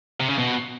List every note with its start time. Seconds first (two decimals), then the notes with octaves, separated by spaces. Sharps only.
0.20 C3
0.29 C#3
0.38 B2